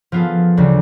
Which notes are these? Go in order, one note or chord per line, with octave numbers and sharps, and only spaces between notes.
F3 B3 F4 G#4 A4
D2 C#3 E3 G3